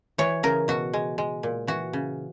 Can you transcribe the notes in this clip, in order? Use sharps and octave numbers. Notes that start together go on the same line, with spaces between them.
E3 C#5
C#3 A#4
B2 F#4
G#3
G#3
A#2
E3 F#4
C#3